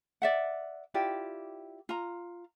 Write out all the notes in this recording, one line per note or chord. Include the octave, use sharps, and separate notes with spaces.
D5 E5 F#5
E4 F4 G4 D5
F4 A#5